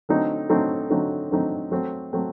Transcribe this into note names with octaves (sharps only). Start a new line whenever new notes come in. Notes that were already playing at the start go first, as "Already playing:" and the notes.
D3 F#3 A3 C4 D#4
D3 F#3 A3 C4 D#4
D3 F#3 A3 C4 D#4
D3 F#3 A3 C4 D#4
F#3 A3 C4
F#3 A3 C4